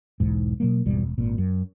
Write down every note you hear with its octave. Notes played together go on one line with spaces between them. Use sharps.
B1 E2 G#2
B2 F#3 A#3
G#1 E2 B2 G3
E1
G#1 A#2
F#2